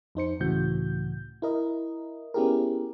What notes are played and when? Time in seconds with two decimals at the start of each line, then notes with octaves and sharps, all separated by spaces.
0.15 F2 D#4 C5 C#7
0.40 C#2 A2 C#3 E3 F#4 G6
1.42 E4 A#4 D#5
2.34 B3 C#4 E4 G4 G#4 A#4